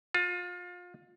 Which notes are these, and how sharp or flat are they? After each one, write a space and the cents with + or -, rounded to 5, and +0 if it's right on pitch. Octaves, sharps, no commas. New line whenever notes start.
F4 +30